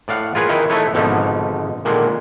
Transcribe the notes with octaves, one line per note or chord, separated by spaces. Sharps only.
A2 D5 F5 F#5
F4 G#4 A#4 B4 C#5 G#5
D#3 D#4 E4 A#4 B4
A3 D#4 E4 A4 B4 C#5
G#1 B2 D3 F3 D#4
A#2 D3 D#3 G#3